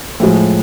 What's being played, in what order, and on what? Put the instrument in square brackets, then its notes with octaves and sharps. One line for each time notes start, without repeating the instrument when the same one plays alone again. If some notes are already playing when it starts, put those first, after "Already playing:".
[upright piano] A2 F3 G#3